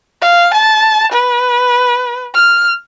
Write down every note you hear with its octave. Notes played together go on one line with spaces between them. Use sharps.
F5
A5
B4
F6